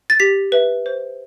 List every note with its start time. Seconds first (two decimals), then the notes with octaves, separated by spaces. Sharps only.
0.10 A6
0.20 G4 B6
0.52 B4 E5
0.86 C5